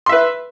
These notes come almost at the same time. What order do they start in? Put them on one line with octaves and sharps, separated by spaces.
C6 E5 B4